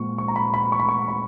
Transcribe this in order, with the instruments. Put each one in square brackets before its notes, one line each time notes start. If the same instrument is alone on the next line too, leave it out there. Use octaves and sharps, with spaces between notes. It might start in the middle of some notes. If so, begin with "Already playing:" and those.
Already playing: [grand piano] A#2 F3 G#3 C#6
C#6
A#5
B5
B5
C#6
B5
C#6
B5